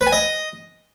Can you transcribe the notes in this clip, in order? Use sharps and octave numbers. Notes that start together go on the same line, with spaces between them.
B4
G#5
D#5